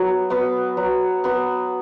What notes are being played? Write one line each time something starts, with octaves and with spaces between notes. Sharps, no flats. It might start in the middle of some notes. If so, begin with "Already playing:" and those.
Already playing: F#3 B3 F#4 B4
B3 F#4 B4
F#3
B3 F#4 B4